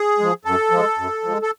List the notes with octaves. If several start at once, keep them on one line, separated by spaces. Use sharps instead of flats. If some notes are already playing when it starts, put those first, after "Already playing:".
Already playing: G#4
F3 G#3
F#2 A4
F3 G#3
F#2
F3 G#3
A4